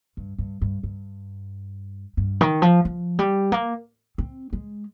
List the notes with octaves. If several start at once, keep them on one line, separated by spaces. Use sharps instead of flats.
G2
G2
G2
G2
G2
D#3
F3
F3
G3
A#3
C4
G#3